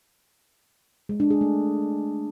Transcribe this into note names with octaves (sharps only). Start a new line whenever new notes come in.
G#3
D4
G#4
A3